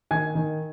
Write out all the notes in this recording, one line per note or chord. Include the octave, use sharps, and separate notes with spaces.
D#3 G#5 G#6
D#3